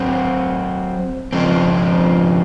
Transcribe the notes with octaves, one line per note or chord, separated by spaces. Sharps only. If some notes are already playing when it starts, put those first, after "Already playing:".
Already playing: F#3 C4 F#4
F2 C#3 F3 C4